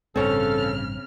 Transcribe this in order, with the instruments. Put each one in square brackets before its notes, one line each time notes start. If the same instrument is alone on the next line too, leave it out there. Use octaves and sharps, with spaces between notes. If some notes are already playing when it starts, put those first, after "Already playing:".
[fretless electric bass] A1 G2 [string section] C#3 F6 [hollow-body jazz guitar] C4 C#5 [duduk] A4